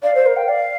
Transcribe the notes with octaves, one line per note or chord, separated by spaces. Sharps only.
D5 F5
C5
A#4
G5
D5 F5